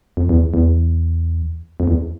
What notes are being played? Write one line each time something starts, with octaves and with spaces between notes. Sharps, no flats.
F2
E2
E2
F2
E2